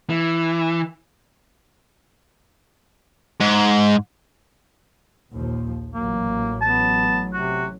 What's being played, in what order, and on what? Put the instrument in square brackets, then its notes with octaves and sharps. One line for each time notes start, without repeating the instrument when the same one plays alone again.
[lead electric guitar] E3
[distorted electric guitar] G#2
[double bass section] A#1 D#2 F3
[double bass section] A1 F#3 [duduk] A#3
[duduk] B3 [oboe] A5
[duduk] C3 [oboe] F#4